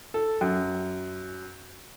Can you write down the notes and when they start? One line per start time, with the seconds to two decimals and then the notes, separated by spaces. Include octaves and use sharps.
0.14 A4
0.41 F#2